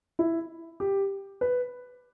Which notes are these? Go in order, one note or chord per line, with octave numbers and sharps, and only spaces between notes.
E4
G4
B4